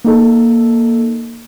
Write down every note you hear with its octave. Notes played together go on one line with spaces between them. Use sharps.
A#3 D#4 A4